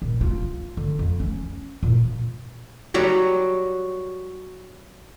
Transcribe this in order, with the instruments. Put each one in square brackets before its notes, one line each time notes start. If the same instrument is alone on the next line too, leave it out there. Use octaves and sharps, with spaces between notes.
[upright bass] A#1
F4
D3
F2
C#4
A#2
[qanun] F#3 G3 F#4